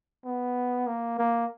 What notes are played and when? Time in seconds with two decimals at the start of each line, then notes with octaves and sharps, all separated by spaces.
0.24 B3
0.87 A#3
1.19 A#3